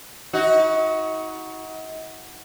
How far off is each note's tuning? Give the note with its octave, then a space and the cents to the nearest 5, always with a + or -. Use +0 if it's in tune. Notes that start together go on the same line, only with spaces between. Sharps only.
D#4 +40 F#4 +0